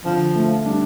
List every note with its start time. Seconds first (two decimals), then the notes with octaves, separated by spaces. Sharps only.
0.05 D3 F3
0.35 A3
0.65 G3 D4